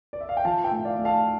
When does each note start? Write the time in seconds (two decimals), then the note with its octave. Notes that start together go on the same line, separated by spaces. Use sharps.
0.13 D5
0.21 E5
0.29 F5
0.37 G5
0.45 F3 F5 A5
0.64 E5 G5
0.71 A2
0.85 D5 F5
0.99 A3
1.05 F5 A5